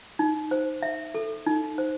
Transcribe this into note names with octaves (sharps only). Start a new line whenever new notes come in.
D#4
C5
E5
A4
D#4
C5